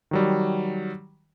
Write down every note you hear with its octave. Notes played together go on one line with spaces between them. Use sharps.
D#3 F#3 G3